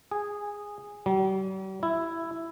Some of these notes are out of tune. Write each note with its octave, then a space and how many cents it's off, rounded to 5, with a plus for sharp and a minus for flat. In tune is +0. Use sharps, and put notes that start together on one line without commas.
G#4 -10
G3 -45
E4 +5